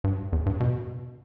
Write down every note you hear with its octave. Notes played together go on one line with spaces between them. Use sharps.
G2
E2
G2
B2